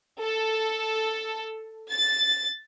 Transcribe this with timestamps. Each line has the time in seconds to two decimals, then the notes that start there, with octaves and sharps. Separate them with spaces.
0.21 A4
1.89 A6